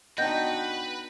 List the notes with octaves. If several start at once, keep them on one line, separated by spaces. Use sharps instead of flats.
B3 D4 D#4 F#4 B4 D#5 G5 G6